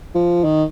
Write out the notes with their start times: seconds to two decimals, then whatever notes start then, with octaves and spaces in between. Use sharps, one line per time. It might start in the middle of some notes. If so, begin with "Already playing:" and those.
0.15 F3
0.44 D#3